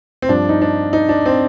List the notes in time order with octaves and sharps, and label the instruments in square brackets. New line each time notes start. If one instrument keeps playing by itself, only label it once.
[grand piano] C4
G2 F3 D4
D#4
D4
D#4
D4
C4